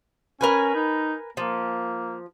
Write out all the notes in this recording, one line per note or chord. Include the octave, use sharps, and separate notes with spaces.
C#4 A#4 B4 G#5
D#4
F3 A#3